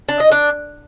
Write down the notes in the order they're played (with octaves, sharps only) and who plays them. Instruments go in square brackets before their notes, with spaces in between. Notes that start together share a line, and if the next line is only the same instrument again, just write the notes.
[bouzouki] D4
D#5
D4